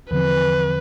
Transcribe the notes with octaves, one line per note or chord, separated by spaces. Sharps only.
E2 D3 F3 C4 B4